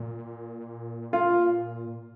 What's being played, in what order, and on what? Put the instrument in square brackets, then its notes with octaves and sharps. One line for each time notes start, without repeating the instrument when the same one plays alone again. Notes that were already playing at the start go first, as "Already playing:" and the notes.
Already playing: [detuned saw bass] A#2
[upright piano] F4